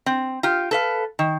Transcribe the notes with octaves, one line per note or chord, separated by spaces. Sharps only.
C4
F4 G4
A4 B4 F5
D#3